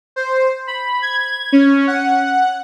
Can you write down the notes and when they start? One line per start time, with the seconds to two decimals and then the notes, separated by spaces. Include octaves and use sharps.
0.16 C5
0.67 B5
1.02 G#6
1.52 C#4
1.87 F#5